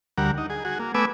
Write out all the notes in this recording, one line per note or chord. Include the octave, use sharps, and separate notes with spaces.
D2 G3 A#4 F#5
D#4
G#4
F#4 G#4
A#3
A3 B3 B4 G#5 D6 E6